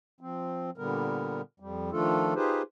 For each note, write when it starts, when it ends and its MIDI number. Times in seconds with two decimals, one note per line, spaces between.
0.21 0.70 53
0.21 0.70 60
0.78 1.42 46
0.78 1.42 50
0.78 1.42 55
0.78 1.42 59
0.78 1.42 70
1.60 1.91 41
1.60 1.91 55
1.92 2.34 51
1.92 2.34 53
1.92 2.34 57
1.92 2.34 62
1.92 2.34 65
1.92 2.34 69
2.35 2.62 63
2.35 2.62 65
2.35 2.62 67
2.35 2.62 68
2.35 2.62 71
2.35 2.62 72